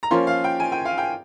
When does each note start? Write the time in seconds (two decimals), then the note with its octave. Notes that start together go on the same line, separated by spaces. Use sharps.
0.03 A#5
0.11 F3 A#3 C#4 F4 C6
0.27 F5
0.44 G5
0.60 G#5
0.72 G5
0.85 F5
0.98 G5